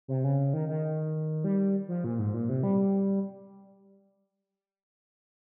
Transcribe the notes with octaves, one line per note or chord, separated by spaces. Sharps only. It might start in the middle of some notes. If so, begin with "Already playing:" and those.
C3
C#3
D#3
D#3
G3
F3
A#2
G#2
A#2
C3
G3